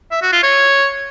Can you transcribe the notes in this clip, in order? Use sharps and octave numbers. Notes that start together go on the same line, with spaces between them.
E5
F#4
F4
C#5